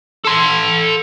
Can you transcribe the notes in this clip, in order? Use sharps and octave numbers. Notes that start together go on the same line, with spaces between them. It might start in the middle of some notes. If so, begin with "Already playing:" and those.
A4 C6